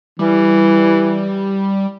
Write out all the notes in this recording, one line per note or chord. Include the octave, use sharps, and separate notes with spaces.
E3 G3